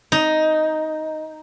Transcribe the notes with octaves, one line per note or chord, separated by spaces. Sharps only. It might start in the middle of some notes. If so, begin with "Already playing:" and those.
D#4